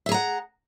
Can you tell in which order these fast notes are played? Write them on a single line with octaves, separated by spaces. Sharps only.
E5 G#4 A#5 F#5